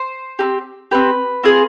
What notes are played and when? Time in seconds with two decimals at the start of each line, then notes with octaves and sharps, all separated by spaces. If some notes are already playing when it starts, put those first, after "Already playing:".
Already playing: C5
0.39 C4 D#4 G4
0.91 C4 G4 B4
1.43 C4 F4 G#4